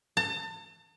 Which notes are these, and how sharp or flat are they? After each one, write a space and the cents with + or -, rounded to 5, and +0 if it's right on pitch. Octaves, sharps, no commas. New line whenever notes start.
A5 +40